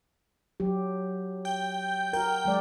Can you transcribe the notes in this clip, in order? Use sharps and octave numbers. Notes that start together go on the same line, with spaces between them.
F#3 G4
G5
F#4 A#4 G5
F#3 G#3 D5